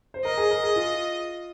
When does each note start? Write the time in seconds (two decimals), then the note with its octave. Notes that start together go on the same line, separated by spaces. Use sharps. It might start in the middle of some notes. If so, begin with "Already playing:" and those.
0.14 C5
0.25 A#4 D#5
0.37 G#4
0.51 A#4
0.64 G#4
0.76 F4